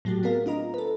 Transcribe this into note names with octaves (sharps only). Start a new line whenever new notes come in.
A2 F#3 A3 F#4 G4
A3 B3 C4 G#4 A#4 F5
D4 F4 D#5 A#5
A4 B4